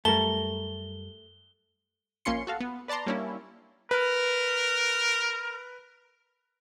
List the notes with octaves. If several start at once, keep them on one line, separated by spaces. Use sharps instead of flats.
F#2 G3 A3 A#4 A5 G7
A#1 A#3 C#4 F4 C6 C#7
F#4 A4 F5
B3
B4 D5 A5 A#5 C6
G3 A#3 C#4 D4 E4
A#4 B4